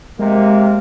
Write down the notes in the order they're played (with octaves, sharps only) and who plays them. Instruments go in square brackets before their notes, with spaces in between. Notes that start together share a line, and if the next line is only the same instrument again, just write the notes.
[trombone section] C3 A#3 [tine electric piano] G#3